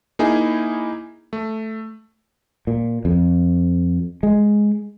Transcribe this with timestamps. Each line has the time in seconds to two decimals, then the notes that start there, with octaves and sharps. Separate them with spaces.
0.19 A#3 D#4 E4 G#4
1.33 A3
2.67 A#2
3.05 F2
4.23 G#3